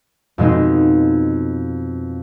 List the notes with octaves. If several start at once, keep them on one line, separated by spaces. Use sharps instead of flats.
F2 B2 G#3 D#4